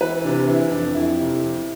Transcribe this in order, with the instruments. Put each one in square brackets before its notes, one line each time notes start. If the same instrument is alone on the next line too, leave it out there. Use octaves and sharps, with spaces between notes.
[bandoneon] E3 [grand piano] B4
[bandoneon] C3 [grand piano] D4
[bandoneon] E3 [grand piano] E4
[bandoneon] F2 [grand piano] D4
[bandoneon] F2 [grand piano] E4
[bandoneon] C3
F2